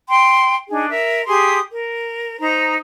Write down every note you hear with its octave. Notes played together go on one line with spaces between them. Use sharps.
G5 C6
D4 D#4 G#4
A#4 E5
G4 G#4 C6 D#6
A#4
D#4 C5 A#5